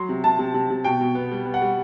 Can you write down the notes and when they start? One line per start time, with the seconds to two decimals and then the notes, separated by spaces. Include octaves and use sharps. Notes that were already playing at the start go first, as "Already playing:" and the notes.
Already playing: F#3 C6
0.09 C3
0.24 C3 A5
0.39 C3
0.54 C3
0.70 C3
0.84 B2 G5
1.01 B2
1.15 B3
1.31 G3
1.46 B3
1.54 F#5
1.62 G3